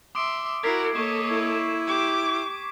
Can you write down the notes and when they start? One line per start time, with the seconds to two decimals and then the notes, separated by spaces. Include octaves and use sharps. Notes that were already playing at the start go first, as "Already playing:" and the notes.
0.15 E5 C6 D6 D#6 D7
0.63 E4 F#4 A#4 G#6 B6 C7
0.95 A#3 A4 C#5 D#5 C#6 E7
1.31 E4
1.88 G4 D6